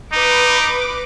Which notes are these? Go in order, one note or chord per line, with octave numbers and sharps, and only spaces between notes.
D#4 B4 D6